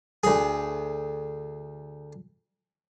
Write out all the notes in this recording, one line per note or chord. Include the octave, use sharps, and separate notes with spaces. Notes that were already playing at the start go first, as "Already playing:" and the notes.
D2 G#4